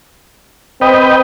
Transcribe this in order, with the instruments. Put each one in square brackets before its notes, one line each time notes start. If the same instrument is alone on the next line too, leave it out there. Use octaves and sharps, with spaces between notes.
[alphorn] C4 [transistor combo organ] B4 D#5 G5